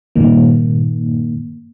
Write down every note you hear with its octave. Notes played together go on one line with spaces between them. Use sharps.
G2 A#2 D#3 A#3